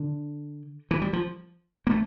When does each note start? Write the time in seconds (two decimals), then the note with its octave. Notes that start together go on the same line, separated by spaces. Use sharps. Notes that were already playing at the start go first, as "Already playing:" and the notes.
Already playing: D3
0.91 E3
1.02 G3
1.13 F3
1.87 A#3
1.91 A3